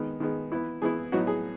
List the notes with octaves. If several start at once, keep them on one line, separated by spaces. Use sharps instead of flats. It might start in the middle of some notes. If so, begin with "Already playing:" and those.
Already playing: D#3 G#3 B3
D#3 G#3 B3
E3 B3 E4
E3 B3 E4 G#4
A2 F#3 B3 D#4 F#4
G#4